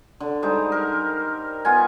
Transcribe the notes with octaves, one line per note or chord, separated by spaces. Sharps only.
D3
G3 G#3 D#4 C5
A#4
B3 F4 F#5 G#5